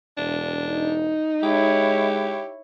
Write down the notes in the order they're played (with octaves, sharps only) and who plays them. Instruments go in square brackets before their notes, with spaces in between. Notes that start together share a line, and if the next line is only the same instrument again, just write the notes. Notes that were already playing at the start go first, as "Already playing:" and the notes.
[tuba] E1 [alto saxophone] D4
[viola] D#4
[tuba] G#3 [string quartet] E4 C#5 [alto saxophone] G4